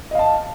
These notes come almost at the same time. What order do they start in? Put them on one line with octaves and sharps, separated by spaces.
D#5 F5 A5